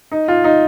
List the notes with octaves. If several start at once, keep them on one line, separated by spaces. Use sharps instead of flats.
D#4
F4
D#4